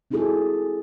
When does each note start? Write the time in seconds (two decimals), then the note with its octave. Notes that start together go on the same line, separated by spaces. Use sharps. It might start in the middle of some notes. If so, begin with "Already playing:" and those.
0.11 C4 D#4 E4 F#4 G#4 A4